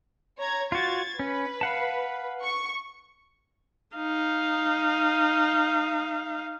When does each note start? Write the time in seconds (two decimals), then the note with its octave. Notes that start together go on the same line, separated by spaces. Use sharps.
0.38 C#5 A#5 G#6
0.72 F4 F#4 G#6 A6
1.19 C#4 B4
1.61 F5 F#5 A5
2.42 C#6
3.96 D#4 F5